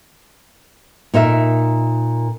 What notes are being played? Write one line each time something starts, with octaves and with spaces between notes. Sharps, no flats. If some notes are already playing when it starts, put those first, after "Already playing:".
A#2 D#4 A#4 E5